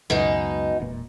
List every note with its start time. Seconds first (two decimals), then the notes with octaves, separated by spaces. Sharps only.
0.10 C#2 F#2 B2 G#3 D#4
0.80 E1 A#2